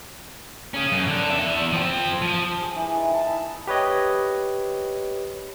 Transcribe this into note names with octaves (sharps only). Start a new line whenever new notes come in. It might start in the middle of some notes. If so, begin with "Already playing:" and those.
C#4 G#4
F#2
D3 D4
E2 E5
F3 C4
F3
G#4
E3
D#3
A5
E4
G4 B4 C#5 D#5